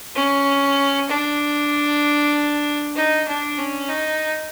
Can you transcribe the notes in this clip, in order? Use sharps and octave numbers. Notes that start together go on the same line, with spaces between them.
C#4
D4
D#4
D4
C#4
D#4